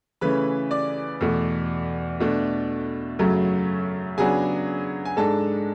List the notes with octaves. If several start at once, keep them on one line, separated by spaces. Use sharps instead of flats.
C#3 E3 A3 C#4 B4 B5
D5 D6
E2 B2 A3
B2 A3 D4
F#2 C#3 F#3 A3
C#3 F#3 B3 D4 G#4 G#5
G#5
G#2 G#3 D4 A4 A5